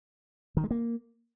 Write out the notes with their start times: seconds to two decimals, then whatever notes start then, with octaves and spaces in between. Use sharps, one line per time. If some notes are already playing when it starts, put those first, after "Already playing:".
0.57 D#3
0.64 G#3
0.71 A#3